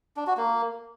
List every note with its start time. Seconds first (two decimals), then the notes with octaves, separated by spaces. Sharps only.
0.17 D4
0.27 F#4
0.37 A#3